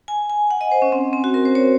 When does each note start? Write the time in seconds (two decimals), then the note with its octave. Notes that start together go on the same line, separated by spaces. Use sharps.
0.08 G#5
0.30 G#5
0.51 F#5
0.61 D#5
0.71 C5
0.82 C#4
0.92 C4
1.13 C4
1.24 F#4
1.34 A#4
1.45 C5
1.55 C#5